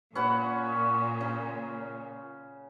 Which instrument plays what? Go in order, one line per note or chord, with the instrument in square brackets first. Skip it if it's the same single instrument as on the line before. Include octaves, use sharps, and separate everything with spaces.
[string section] A#2 [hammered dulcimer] C#4 B4 F#5
[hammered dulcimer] C#3